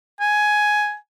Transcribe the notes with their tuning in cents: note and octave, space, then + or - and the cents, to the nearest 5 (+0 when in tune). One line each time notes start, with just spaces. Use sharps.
G#5 +10